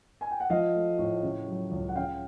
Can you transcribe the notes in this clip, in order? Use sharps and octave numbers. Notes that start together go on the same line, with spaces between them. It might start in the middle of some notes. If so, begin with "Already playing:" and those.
G#5
G5
F#5
F3 D#5 F5
A3
A2
C#3
F#3
C#2
F#5
C#3 F5 G5